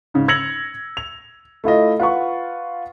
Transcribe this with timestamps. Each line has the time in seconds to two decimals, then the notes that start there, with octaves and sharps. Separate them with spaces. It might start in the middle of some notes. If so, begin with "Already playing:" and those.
0.14 G#2 C#3
0.28 E6 G#6 A#6 C#7 F7 F#7
0.97 F7
1.64 A3 E4 F4 D#5
2.00 F4 B4 F#5 C#6